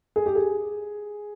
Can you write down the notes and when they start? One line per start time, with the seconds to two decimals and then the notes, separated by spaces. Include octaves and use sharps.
0.16 G#4
0.26 G4
0.35 G#4